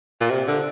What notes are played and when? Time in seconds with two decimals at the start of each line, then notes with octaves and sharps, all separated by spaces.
0.20 A#2
0.31 C3
0.48 D3